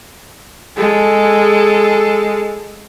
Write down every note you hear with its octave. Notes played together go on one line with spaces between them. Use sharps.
G#3 A4